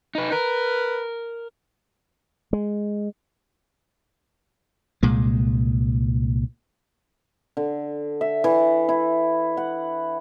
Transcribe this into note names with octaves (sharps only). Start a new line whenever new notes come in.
D#4 B4
A#4 B4
G#3
C2 A#2 G#3
D3
E5
E3
E4
F#5